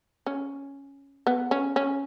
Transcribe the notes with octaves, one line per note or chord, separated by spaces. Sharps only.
C#4
B3
C#4
C#4